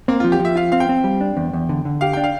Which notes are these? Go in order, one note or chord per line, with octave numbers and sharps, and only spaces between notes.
A#3 C4
F3 F4
G4
F3
E5
F4 F5
C4 F5
G5
C4
G3
D4
E2
E2
D3
D3
G4 F5
D4 G5
F5